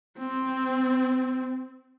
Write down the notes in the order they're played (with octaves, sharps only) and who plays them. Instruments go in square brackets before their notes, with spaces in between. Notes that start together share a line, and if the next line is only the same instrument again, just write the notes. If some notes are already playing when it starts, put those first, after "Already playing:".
[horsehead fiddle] C4